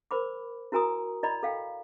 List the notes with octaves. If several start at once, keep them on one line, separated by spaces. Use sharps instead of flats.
A#4 C5 B5 D6
E4 F#4 A#4 G#5 A#5 D#6
E4 D5 D#5 A#5 B5
A4 F5 G5